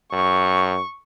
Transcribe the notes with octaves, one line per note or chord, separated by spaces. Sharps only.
F#2 C#6